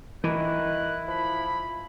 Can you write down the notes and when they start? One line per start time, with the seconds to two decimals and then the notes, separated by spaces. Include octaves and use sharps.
0.24 D#3 E3 E4 F#6
1.08 F3 B5